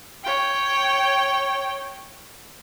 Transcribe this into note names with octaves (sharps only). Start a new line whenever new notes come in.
C#5 G5